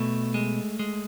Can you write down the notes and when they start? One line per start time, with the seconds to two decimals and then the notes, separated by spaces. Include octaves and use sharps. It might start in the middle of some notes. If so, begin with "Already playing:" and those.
Already playing: B2 A3
0.34 G#3
0.79 G#3